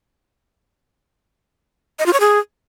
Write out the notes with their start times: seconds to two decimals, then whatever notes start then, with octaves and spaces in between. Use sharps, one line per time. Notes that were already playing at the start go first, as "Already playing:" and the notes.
1.99 D#5
2.06 F4
2.13 C#5
2.20 G#4